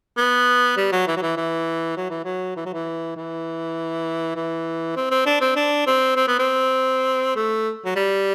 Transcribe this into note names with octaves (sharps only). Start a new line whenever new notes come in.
B3
G3
F#3
E3
F#3
E3
E3
F#3
E3
F#3
E3
F#3
E3
E3
E3
C4
C4
D4
C4
D4
C4
C4
B3
C4
A3
F#3
G3